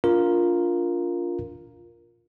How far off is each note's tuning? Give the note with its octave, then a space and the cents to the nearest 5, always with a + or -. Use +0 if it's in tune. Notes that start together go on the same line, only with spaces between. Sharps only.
D4 -25 F4 +0 A#4 +0